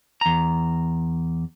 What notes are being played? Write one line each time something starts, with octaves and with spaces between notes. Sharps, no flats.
E2 A#5